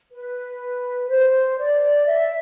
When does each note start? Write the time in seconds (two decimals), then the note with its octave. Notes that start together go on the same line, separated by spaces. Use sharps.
0.11 B4
1.09 C5
1.59 D5
2.07 E5